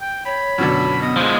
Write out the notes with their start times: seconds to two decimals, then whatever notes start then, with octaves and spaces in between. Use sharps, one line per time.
0.01 G5
0.25 C#5 B5
0.58 F#2 B2 D3
1.01 B3 D#5
1.17 F3 G#3 C5